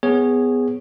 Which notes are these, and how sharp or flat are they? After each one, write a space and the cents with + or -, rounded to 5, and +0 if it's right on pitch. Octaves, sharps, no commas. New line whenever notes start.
B3 +15 G#4 -10 C#5 +0